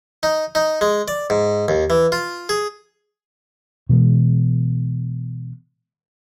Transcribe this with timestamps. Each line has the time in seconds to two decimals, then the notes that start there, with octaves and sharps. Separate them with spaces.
0.23 D#4
0.55 D#4
0.81 G#3
1.08 D5
1.30 G#2
1.68 D#2
1.90 E3
2.12 F4
2.49 G#4
3.89 B2 E3 G#3